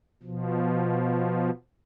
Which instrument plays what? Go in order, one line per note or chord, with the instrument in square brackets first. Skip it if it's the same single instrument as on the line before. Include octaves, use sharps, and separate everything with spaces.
[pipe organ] B2 F3